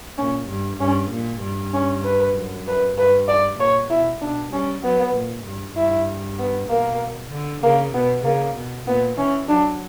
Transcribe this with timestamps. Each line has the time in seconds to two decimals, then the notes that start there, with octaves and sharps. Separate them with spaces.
0.18 A#2 C#4
0.49 G2
0.80 G2 C#4
1.11 A#2
1.42 G2
1.74 C#4
2.04 B4
2.35 F#2
2.67 B4
2.97 G2 B4
3.28 D5
3.59 A#2 C#5
3.90 B2 E4
4.21 B2 D4
4.53 G3 C#4
4.83 F#3 B3
5.14 A#2
5.45 G2
5.76 G2 E4
6.39 B3
6.69 B2 A#3
7.31 D3
7.63 C#3 A#3
7.94 B2 B3
8.24 C#3 A#3
8.56 B2
8.87 A#2 B3
9.18 E3 C#4
9.49 F#3 D4